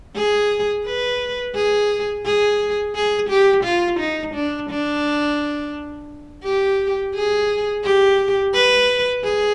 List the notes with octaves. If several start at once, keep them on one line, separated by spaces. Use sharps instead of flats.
G#4
B4
G#4
G#4
G#4
G4
F4
D#4
D4
D4
G4
G#4
G4
B4
G#4